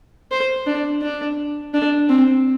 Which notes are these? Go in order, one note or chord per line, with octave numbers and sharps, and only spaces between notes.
C5
D4
D4
D4
C4